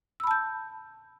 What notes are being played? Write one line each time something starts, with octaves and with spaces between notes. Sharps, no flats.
A5 B5 E6 G6